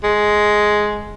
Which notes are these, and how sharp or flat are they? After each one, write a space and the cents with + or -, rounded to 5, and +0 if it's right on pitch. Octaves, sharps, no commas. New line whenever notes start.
G#3 +5